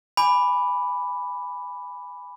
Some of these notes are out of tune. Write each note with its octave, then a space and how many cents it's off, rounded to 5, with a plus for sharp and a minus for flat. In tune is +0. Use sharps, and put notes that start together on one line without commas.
G#5 -10 B5 +0 D6 +0